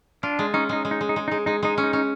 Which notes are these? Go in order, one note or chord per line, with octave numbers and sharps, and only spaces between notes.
D4 F4
G#3
C#4 D#4
G#3 D#4
G#3
D#4
G#3
D#4
G#3
G#3 D#4
G#3 D#4
G#3 D#4
C#4
D#4
C#4